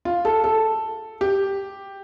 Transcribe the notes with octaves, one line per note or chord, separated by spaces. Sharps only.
F4
A4
A4
G4